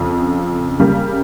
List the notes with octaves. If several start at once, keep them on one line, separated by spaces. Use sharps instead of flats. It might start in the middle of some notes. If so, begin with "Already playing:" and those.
Already playing: F2 C#3 F3
C#3 G3 A#3